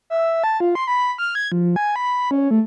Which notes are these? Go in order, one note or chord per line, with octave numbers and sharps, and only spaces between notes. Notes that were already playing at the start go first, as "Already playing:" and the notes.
E5
A5
F4
C6
B5
F6
G#6
F3
G#5
B5
C#4
A3